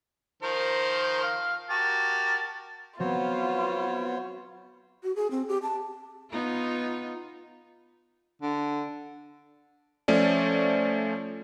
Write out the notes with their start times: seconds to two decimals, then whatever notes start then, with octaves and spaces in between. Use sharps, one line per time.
0.42 D#3 F3 A#4 C5
1.23 F5
1.70 F#4 G4 A#4 A5
3.00 F#3 B3 C4 F4 C5 C#5
5.04 F#4
5.16 G#4
5.31 C4
5.48 G4
5.63 A5
6.30 B3 D#4 F4
8.42 D3
10.08 F3 A3 C#4 D5